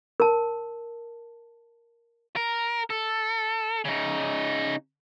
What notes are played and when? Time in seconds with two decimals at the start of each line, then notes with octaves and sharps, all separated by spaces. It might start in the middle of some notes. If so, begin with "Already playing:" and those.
0.20 A#4 A5
2.36 A#4
2.90 A4
3.85 C#3 D#4